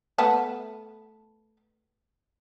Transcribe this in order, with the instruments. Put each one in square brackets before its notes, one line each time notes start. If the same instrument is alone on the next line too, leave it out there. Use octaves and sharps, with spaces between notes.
[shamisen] A3 B3 A5